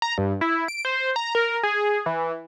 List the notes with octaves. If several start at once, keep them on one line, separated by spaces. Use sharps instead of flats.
A#5
G2
E4
D7
C5
A#5
A#4
G#4
E3